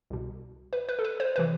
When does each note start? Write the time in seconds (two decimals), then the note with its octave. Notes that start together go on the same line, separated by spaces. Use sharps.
0.10 C2 B2
0.73 B4
0.89 B4
0.99 A4
1.05 B4
1.20 C5
1.36 C3 E3 B4